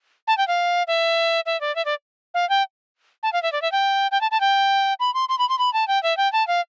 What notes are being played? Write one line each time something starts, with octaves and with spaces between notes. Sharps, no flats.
A5
G5
F5
E5
E5
D5
E5
D5
F5
G5
A5
F5
E5
D5
E5
G5
G5
A5
A5
G5
B5
C6
C6
B5
C6
B5
A5
G5
E5
G5
A5
F5